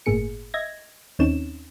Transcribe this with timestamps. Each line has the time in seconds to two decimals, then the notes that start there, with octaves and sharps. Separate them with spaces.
0.06 G1 A2 A#3 G#4 C#7
0.54 D#5 E5 G#6 A#6
1.19 D#2 C4 C#4 D#4 C#5 E7